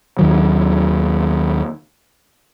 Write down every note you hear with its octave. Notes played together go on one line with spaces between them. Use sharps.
D#2 D#3 F#3